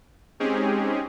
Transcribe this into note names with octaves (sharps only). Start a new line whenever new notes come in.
G#3 C4 C#4 D#4 G4 G#4